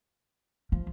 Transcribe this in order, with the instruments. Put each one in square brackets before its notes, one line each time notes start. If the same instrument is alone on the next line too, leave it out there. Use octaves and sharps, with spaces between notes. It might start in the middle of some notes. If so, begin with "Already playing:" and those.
[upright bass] F3